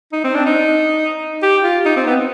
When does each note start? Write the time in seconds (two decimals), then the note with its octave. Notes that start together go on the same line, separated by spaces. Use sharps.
0.12 D#4
0.24 C4
0.35 D4
0.46 D#4
1.42 G4
1.63 F4
1.86 D#4
1.97 C4
2.07 B3